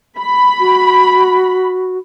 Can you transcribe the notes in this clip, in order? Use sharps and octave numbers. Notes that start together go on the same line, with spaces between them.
B5
F#4